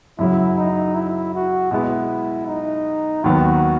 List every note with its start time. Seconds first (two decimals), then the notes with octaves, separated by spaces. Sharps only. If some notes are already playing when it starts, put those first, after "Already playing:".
0.19 F#2 C#3 F#3 E4
0.58 D#4
0.95 E4
1.34 F#4
1.71 B2 G#3 B3 E4
2.47 D#4
3.24 D#2 D#3 F#3 B3 F#4